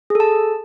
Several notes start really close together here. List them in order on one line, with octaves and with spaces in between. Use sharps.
G#4 A4 A5